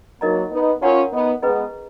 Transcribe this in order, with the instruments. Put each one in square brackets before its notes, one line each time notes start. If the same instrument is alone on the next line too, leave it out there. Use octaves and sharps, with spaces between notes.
[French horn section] F#3 A#3 [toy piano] D#4 A#4 D#5 A#5
[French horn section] B3 D#4
[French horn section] C#4 F4 [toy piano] A#4 C#5 F#5 A#5
[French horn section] B3 D#4
[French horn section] G#3 B3 [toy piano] C#4 G#4 B4 D#5 A#5